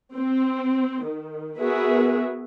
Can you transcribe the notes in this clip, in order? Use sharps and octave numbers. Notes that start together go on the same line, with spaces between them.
C4
D#3
B3 F#4 G#4 A#4 B4 E5